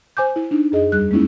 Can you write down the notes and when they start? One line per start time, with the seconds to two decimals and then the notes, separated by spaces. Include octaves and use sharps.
0.17 C5 G#5 D6 G6
0.36 E4
0.51 D4 D#4
0.72 F#2 G#4 D#5
0.92 E2 G3 G#4 F#6
1.11 G#3 A#3 C#4 D#4 E4